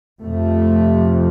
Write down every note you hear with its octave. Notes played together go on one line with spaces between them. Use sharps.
F2 C3 A3